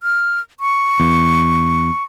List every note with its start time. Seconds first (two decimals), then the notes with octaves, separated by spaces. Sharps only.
0.03 F6
0.60 C#6
1.00 E2